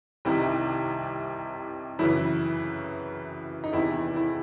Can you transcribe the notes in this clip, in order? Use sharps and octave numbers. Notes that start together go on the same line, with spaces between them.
C2 C3 D#3 E4
F#2 C#3 E3 E4
D#4
E2 C3 D#3 E4
E4